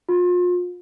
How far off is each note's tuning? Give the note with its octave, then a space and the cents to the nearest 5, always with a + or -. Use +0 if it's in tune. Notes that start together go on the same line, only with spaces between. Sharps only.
F4 +35